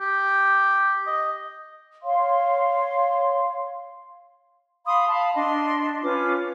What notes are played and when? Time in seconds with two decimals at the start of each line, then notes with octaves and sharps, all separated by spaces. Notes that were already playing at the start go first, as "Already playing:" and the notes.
0.01 G4
1.07 D#5
2.03 C#5 F5 C6
4.86 F5 B5 C6 D#6
5.08 F5 A5 B5
5.35 D4 D#5 C6
6.03 C#4 F4 B4 D6